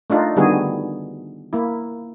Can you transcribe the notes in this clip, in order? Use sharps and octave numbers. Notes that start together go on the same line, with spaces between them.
A3 D4 D#4 F4
D3 D#3 G3 B3 F#4 G#4
A#3 E4